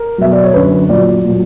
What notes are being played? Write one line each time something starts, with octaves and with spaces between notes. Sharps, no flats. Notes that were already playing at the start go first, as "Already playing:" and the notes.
Already playing: A#4
B2 F#3 E5
D5
C#5
F#2 D3 F#3 B4
A#2 F#3 D5
A#2 F#3